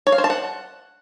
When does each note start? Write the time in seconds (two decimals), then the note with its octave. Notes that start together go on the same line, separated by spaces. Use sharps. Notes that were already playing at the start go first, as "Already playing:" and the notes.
0.07 C#5
0.12 F5
0.18 C5
0.24 A5
0.30 F#5